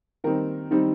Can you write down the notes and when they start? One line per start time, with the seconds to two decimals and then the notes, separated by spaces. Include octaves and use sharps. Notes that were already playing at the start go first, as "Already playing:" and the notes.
0.24 D#3 G3 C4 D#4 A#4
0.71 D#3 G3 C4 D#4